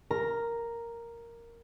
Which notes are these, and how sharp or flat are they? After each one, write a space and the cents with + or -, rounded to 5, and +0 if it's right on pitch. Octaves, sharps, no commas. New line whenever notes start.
A#4 +0 A#5 +0